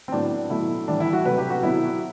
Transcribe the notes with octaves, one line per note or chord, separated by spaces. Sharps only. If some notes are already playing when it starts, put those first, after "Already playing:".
C4
A2 F#3 B3 D4
B2 F#3 A3 E4
A2 E3 G3 D4
E4
F#4
C3 F#3 A3 B4
G4
F#4
B2 F#3 B3 E4